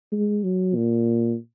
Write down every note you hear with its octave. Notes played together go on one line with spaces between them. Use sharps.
G#3
F#3
A#2